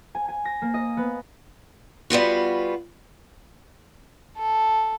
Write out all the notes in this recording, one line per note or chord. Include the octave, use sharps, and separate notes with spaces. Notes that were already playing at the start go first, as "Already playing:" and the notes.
G#5
G#5
A#6
A#3
D#5
B3
G3 B3 F4 F#4
A4